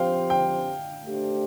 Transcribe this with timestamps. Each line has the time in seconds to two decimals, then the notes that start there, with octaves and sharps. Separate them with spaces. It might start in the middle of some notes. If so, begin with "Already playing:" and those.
Already playing: F3 C4 G4 C5 F5 G5
0.30 G5
1.03 A3 D4 G4 C5